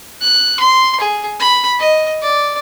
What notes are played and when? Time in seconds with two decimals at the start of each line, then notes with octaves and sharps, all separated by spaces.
0.21 F#6
0.60 C6
1.00 G#4
1.40 B5
1.79 D#5
2.22 D5